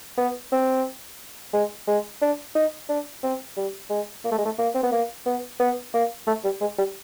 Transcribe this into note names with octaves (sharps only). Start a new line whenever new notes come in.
B3
C4
G#3
G#3
D4
D#4
D4
C4
G3
G#3
A#3
A3
G#3
A3
A#3
C4
B3
A#3
B3
B3
A#3
A3
G3
G#3
G3